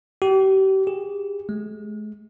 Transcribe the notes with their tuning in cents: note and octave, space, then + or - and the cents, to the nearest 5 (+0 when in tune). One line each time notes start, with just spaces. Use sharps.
G4 -35
G#4 -45
G#3 +40